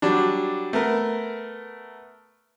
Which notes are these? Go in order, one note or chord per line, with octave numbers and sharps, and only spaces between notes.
F#3 G3 D4
A3 B3 A#4